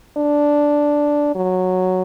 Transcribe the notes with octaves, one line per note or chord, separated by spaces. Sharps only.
D4
F#3